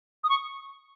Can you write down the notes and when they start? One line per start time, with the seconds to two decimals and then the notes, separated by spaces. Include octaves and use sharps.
0.24 D#6
0.29 C#6